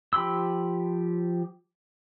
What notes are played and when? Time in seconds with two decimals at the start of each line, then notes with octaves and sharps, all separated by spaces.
0.13 F3 G4 B5 C6 E6